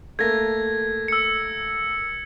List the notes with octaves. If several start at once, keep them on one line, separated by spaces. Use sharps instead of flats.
A3 A#3 G#6 A#6
E6 C#7